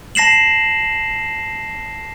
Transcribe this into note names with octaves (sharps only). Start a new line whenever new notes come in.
A5 A#6 C7 E7 F#7